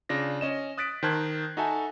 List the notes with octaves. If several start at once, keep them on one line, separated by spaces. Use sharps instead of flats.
C#3 D4 F4 A#6
C#4 D#5 E7
D#6 F#6 A6 B6 D7
D#3 C5 A5 F#6 G#6
D#4 F#4 A4 E5 G#5 A5